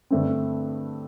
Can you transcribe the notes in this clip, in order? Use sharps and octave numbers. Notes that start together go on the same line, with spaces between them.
G2 D3 A3 C4